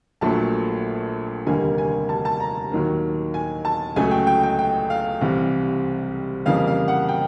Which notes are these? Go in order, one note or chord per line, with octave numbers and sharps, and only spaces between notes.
A#1 A#2 F#3 A3 A5
F1 D#2 D3 G3 A#3 G#5
G#5
A5
A5
A#5
D#2 D#3 F#3 A#3
G#5
A5
C#2 C#3 F#3 A3 G#5
G5
G5
G5
G5
F5
C2 C3 E3 G3
F2 C#3 E3 G3 A#3 F5
F5
F#5
G5